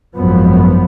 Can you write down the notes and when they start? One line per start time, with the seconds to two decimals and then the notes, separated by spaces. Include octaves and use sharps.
0.17 G#1 F#2 F3 B3